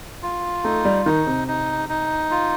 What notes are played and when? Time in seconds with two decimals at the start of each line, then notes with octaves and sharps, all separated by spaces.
0.23 F4
0.64 A3 D#4
0.85 G3
1.05 D#3 D#4
1.27 C3
1.48 D#4
1.89 D#4
2.31 F4